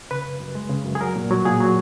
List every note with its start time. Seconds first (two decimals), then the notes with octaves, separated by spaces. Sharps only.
0.11 C#3 B4
0.26 F#2
0.40 F#2
0.55 G#3
0.70 C#3
0.85 F#2
0.95 G#4
1.01 F#3 A#4
1.16 A#2
1.31 F#3
1.45 A#2 G#4
1.60 F#3